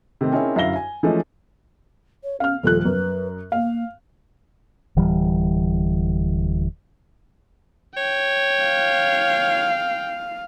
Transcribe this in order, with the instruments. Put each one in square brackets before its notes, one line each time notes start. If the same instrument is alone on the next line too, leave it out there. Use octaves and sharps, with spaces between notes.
[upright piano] C3 D#3 A3 C4 G4
C4 C#4 D#4 E4 G#4 A#4
G1 F#2 E4 F5 A#6 G7
G#5
E3 F3 G#3 A3 C#4 D#4
[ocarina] C#5
[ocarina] C#4 [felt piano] F5 F6
[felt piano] D#1 F3 F#6 [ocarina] A4
[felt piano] F#2 [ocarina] B4
[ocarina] A#3 [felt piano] F5
[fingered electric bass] D1 E3 G3
[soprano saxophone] C#5 [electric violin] G5
[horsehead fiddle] F5